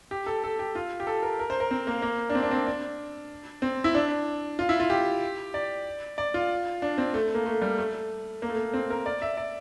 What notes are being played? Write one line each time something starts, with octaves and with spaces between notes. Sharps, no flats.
G4
A4
A4
G4
F4
G4
A4
A#4
A#4
C5
A#4
C4
A#3
A#3
D4
C4
D4
C4
D4
C4
E4
D4
F4
E4
F4
G4
D5
D5
F4
D4
C4
A3
A#3
A3
G3
A3
A#3
A3
A#3
C4
A#4
D5
E5
D5